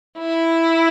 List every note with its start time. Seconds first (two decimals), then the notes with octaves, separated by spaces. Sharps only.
0.18 E4